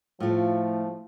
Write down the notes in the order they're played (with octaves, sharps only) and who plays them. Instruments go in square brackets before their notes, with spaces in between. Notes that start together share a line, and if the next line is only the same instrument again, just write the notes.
[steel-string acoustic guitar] A2 A3 [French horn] F3 [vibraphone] E4 F4 F5